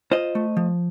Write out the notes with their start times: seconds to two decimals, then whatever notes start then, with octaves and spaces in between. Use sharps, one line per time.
0.12 F4 C5 D#5
0.35 A3
0.57 F3